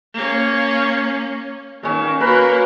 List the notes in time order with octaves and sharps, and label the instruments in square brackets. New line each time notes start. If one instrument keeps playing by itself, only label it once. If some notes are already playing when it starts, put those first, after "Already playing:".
[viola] A#3 C#4
[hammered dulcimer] A#2 C#4 [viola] D#3
[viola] A#3 F#4 [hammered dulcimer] A#4 B4